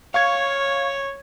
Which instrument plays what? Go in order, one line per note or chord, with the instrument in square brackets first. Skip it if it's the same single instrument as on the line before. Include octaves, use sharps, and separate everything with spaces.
[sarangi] C#5 [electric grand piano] F5 C#6 G#6